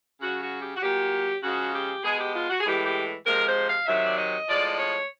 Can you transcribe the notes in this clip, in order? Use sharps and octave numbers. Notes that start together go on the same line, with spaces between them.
C#3 F#3 F#4
F#4
G4
F#4
A#2 F#3 G4
C#3 F3 G#3 F#4
G4
B2 G#3 G#4
G4
F4
F#4
G#4
A2 E3 G#3 G4
G4
C3 F3 G#3 A#4
C5
F5
C3 D#3 F#3 E5
D5
D#5
A2 F3 G#3 D5
D5
C#5